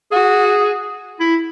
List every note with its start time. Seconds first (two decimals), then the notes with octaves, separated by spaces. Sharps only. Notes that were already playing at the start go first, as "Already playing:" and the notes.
0.12 F#4 G#4
1.20 E4